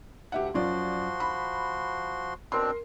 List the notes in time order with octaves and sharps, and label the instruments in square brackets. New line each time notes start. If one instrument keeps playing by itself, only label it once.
[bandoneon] D2 [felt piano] G4 E5 F#5
[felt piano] F#2 F4 D5 [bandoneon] F3 F#4 C6
[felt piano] B5
[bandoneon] B2 C4 D4 [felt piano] A#4 C6